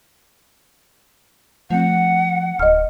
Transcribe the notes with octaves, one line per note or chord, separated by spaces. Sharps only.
F3 A3 C4 F#5
D1 D#5 F6